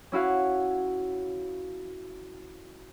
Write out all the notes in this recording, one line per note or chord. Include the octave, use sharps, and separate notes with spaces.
C#4 E4 F#4 F5